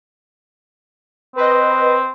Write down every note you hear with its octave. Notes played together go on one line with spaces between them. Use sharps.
C4 B4 D#5